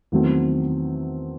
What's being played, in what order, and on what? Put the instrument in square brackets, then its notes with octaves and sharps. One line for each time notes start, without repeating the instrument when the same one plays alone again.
[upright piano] E2 D#3 F#3 A3 C4